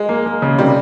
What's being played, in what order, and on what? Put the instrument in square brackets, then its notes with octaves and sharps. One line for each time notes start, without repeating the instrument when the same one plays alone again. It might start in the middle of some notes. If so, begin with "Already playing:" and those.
Already playing: [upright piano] G#3
[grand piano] A#3
A#3
C#3
[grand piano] C3 [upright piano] G3